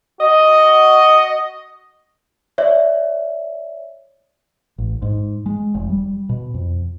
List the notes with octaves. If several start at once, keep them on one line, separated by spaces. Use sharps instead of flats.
F#4 D#5
C#5 D5 E5
A1
G#2
G#3
F1
G3
B2
F2